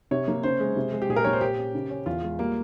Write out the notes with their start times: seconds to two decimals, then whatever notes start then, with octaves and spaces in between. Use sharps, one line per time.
0.11 C3 C#5
0.28 A#3
0.43 C#3 C5
0.60 G#3
0.76 C3
0.92 G#3
1.02 G4
1.09 A#2 G#4
1.16 A#4
1.25 A#3 C#5
1.33 C5
1.41 A#2 G4
1.58 C#4
1.74 C#3
1.90 C#4
2.06 E2 F4
2.23 G#3
2.39 G3 A#3